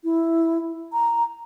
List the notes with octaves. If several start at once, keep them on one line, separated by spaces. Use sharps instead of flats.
E4
A#5